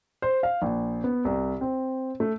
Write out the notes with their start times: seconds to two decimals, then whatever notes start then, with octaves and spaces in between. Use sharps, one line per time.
0.22 C5
0.43 F5
0.62 A#1
1.04 B3
1.25 C2
1.61 C4
2.20 A3